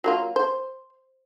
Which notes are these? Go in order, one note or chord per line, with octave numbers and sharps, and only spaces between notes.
F#3 A#3 F4
C5